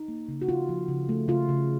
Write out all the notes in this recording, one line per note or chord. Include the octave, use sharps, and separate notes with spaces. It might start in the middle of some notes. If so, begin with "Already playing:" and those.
Already playing: D#4
A#3
C#3
F#4
C#3 F4
F3
C#3
A3
C#3 F4
C#3